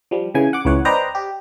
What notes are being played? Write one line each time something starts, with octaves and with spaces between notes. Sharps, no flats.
F3 G3
C#3 E3 G#5
F#5 D6
C#2 E3 C#5 F#5
B4 C5 D5 D#5 G5 A#5
G4